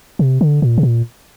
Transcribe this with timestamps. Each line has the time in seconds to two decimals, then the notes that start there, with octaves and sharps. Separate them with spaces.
0.19 C3
0.41 D3
0.62 A#2
0.78 C3
0.83 A#2